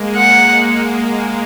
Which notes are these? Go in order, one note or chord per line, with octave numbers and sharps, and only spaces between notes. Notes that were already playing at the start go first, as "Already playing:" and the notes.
Already playing: G#3 A#3
F#5